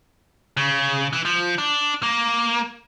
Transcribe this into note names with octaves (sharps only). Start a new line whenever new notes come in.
C#3
E3
F3
D4
A#3